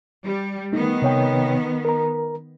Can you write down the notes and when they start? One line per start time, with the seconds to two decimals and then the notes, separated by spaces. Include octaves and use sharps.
0.25 G3
0.73 D#3 A3 B3 D#4
1.02 C3 C#5 G5
1.85 A#4 A#5